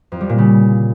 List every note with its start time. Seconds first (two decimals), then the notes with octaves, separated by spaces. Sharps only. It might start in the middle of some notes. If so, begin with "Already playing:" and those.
0.12 F2
0.21 G3
0.29 A#2
0.38 C#3